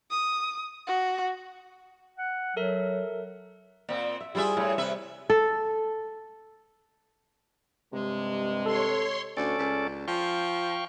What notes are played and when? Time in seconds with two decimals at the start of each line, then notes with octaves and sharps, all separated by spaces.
0.11 D#6
0.87 F#4
2.18 F#5
2.56 F#3 A4 A#4 E5
3.89 A#2 C4
4.20 E5
4.35 G3 E4 F4 G#4 C5 E5
4.57 A2 E4 C#5
4.78 C3 B4 E5
5.30 A4
7.92 G2 C3 G#3
8.66 A4 C#5 C6
9.37 D2 C#4 A4 D5
9.59 C#2
10.08 F3 F5 G5 C#6